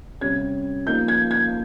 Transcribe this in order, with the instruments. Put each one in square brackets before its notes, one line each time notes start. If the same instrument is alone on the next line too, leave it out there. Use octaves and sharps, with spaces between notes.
[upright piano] C3 G3 C#4 G#6
F3 A#3 D#4 G6
G#6
G#6